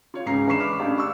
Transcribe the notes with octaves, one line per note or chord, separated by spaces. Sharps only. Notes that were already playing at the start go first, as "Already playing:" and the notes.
F4 C#5 F5
C#2 G#2 C#3 A#5 C7
E3 D4 B5 C#6 C7 E7
B5 D6 F6
A1 D4 G4 F5
C#6 E6